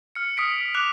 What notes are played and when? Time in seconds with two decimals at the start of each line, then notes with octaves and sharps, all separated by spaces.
0.15 F6 C#7
0.37 D#6 F6 B6 D7
0.74 D6 F#6 F7